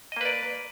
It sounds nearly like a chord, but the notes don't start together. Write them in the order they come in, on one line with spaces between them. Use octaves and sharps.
D#5 A#3 B4 D5